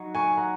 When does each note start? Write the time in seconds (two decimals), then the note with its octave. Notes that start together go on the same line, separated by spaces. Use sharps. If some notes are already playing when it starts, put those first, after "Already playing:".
Already playing: F#3 D#4 F#4
0.15 G#5 C#6
0.37 F#5 A#5